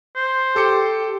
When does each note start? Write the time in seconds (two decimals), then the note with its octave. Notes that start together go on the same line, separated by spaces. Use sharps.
0.15 C5
0.56 G4 A4 D6 C#7